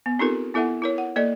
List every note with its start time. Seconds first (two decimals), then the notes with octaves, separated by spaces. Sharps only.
0.06 B3
0.19 C4 D#4 F4 G4 A4 A#4
0.54 B3 E4 A4 E5 F#5
0.82 E4 A#4 C#5
0.98 F#5
1.16 A#3 A4 D5 D#5